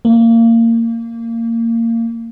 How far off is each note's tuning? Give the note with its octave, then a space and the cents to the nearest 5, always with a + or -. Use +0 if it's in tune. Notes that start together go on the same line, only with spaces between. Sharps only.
A#3 -25